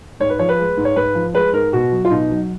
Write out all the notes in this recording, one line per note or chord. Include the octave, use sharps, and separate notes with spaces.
G#2 C#5
B4
F3 C#5
B4
G#3
G#2
C#5
G#2 B4
F3
G#3 B4
G#2 A#4
B2 F#4
F#3
F4
B2 D#4
F#3